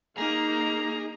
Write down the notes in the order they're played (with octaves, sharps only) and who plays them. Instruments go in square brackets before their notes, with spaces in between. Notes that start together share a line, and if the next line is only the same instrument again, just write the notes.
[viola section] A#3 [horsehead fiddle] D#4 [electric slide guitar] G#4 [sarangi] A#5